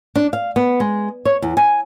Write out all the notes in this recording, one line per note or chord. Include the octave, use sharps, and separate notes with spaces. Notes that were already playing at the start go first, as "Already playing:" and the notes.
D4
F5
B3
G#3
C#5
E2
G#5